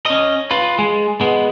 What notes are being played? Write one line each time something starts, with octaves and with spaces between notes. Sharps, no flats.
C#4 D#5
F4 B4
G#3
G#3 B3